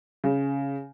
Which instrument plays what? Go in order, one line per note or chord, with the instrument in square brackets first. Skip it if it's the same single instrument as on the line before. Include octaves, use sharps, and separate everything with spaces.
[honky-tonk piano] C#3